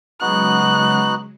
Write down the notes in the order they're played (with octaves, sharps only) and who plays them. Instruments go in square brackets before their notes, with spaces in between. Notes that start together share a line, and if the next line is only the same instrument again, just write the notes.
[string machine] C#3 F#3 G#3 [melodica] B3 D#4 F#4 [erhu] F#6